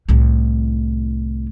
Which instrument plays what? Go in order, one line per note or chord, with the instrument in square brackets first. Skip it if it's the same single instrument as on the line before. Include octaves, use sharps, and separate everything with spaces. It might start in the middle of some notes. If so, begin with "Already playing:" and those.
[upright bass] C2 A2